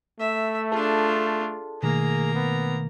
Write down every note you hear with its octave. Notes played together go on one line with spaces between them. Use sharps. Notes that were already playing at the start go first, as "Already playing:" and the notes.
A3 E5
D4 F4 G#4 A4 A5
B2 D#3 A3 A#3 G#4 A#5
B3